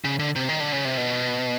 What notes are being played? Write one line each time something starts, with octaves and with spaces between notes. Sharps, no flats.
C#3
D3
C3
D#3
D3
C#3
C3
B2